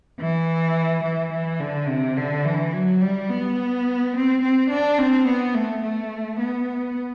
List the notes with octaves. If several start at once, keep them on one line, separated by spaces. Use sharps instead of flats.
E3
E3
E3
D3
C3
D3
E3
F#3
G3
B3
C4
C4
D4
C4
B3
A3
A3
B3